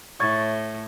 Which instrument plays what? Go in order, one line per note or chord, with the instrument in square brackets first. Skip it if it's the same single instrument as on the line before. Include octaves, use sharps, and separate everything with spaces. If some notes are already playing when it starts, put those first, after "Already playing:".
[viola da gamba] A2 [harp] C#6 G#6 A6